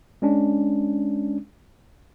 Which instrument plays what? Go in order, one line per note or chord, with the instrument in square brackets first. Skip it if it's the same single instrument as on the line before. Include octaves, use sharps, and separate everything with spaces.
[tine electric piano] G#3 C#4 D4